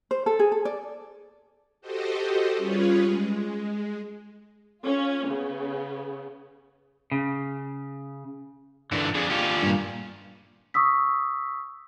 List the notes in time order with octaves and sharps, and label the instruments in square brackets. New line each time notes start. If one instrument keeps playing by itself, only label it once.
[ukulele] C5
A4
G#4
A4
D5
[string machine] F#4 G4 A4 C5 D#5
G3 C#4 F4 G#4 B4 C#5
G#3
[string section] C#4 F4
C#3 B3
[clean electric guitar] C#3
[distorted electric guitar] G2 A#2 [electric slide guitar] D3 E3 D4
[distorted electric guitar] F2 [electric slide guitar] D4 G#4
[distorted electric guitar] D#2 C#4 [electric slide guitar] D4 F4 G4
[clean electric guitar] G2 A#2
[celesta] C#6 D#6 E6 B6